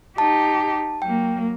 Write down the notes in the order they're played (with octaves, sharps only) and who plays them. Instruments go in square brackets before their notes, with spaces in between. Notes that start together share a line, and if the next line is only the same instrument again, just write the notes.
[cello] D#4 G4 [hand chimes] A5
[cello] F#3 A#3 [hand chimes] G5